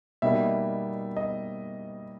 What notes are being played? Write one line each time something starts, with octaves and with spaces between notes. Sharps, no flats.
B2 G3 A#3 D#4 E5
D#5